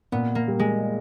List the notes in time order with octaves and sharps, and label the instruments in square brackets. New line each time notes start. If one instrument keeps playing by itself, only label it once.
[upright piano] A#2 [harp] B3
[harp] A#3
[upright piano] G3
[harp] G#3